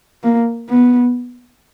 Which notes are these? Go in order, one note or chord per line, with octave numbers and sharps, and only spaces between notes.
A#3
B3